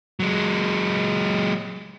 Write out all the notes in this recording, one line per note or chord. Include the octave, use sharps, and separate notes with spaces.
F#3 G#3